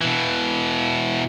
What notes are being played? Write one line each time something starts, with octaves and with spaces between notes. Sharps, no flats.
B2 E3